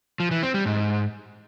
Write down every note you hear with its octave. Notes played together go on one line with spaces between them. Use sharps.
F3
E3
C4
G3
G#2